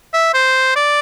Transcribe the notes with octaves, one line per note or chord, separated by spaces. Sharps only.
E5
C5
D5